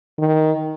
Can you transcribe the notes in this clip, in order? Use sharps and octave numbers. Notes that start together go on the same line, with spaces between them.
D#3